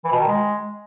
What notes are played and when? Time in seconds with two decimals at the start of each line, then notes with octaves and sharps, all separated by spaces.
0.05 E3
0.12 B2
0.20 D#3
0.28 G#3